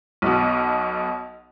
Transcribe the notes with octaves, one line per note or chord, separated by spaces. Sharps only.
B1 B2